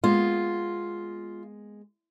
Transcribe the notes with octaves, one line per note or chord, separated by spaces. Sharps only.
G#3 A#3 B3 F4